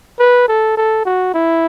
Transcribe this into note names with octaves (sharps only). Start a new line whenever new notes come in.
B4
A4
A4
F#4
E4